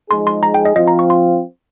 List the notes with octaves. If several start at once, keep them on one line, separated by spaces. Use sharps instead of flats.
F3 G#3 D#4 G#4 C6
C6
A#5
G5
D#5
F3 C4 F4 D#5
A#5
C#6
C6